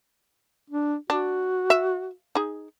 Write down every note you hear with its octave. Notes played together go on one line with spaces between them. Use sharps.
D4
D4 F#4
E5
D#4 G#4